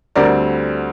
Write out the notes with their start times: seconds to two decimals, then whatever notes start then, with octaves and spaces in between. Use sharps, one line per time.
0.15 D2 D3 G3 C4 A#4 D5